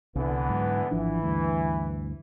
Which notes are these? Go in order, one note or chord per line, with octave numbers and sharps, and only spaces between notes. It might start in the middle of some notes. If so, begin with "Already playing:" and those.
C2 D3 E3 B3
G#2 F#3
G#1 E3 F3 D4
D2 G2